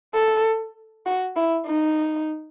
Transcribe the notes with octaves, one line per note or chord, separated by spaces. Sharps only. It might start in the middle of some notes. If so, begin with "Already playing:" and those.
A4
F#4
E4
D#4